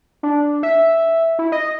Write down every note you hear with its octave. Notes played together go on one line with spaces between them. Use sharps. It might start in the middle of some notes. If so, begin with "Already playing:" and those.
D4
E5
E4
D#5